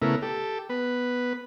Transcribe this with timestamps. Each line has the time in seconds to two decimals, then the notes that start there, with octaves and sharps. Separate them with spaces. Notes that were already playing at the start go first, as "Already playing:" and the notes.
0.02 C#3 A3 B3 E4 A#4
0.22 G4 A4
0.69 B3 B4